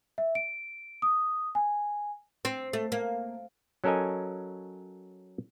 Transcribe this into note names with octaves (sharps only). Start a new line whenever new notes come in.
E5
D7
D#6
G#5
C4
A3
A#3
F#3 C#4 A4 A#4 D#5 G#5